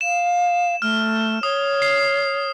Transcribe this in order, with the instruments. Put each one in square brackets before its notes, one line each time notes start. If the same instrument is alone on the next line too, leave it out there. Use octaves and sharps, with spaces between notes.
[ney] F5 [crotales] E7
[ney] A3 [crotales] F6
[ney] C#5 [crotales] D#6
[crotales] C7